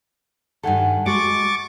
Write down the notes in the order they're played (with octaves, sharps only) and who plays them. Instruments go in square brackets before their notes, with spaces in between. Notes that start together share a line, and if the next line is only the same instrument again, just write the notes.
[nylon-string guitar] G2 D#3 [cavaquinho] A4 F#5 G#5
[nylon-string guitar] G#3 F#4 [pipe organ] C#6 D6 A6